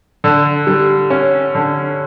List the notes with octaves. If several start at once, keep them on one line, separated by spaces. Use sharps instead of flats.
D3
G3
C#4
D3